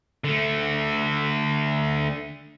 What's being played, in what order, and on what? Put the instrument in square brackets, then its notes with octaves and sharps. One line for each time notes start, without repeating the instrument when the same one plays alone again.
[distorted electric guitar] D3 A3